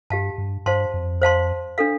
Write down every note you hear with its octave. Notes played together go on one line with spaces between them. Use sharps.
G2 G4 F5 A5
G2
G2 C5 F5 A5 C6
F2
C5 F5 A5 C6
D4 A4 F5